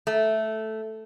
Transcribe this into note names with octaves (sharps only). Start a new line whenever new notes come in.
A3